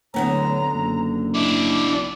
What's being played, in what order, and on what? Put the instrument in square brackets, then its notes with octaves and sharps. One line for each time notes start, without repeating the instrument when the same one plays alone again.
[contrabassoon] D1 [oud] D3 B3 C#4 [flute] A#5
[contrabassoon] F#1
[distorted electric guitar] D4 E4 [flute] D6
[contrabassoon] B1